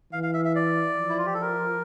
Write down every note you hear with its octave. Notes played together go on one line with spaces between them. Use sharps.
E3 F5
F5
E5
E5
D5
F3
E4
F4
G4
A4
A#4